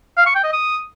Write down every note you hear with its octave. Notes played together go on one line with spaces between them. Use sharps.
F5
C#6
G5
D#5
D#6